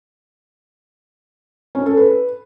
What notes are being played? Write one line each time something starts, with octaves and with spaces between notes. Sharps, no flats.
C#4
A4
B4